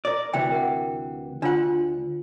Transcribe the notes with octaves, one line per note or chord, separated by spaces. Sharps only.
A#4 D5
D2 C3 E3 G5
A#4 F#5
D2 D4 F4 F#5